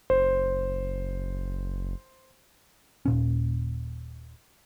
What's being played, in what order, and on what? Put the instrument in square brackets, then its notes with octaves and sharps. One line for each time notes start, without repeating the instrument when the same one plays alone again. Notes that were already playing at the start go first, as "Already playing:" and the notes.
[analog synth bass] F#1 [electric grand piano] C5
[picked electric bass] D#1 A#2 C#4